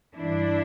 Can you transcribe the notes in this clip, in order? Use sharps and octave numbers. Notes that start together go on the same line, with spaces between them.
G2 E3 D4 E4